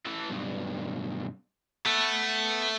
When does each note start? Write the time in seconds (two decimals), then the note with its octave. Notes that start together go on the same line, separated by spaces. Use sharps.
0.06 E3 A4
0.30 B1 G2
1.86 A3 B3